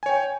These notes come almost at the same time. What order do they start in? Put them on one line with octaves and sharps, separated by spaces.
G#5 C#5 G5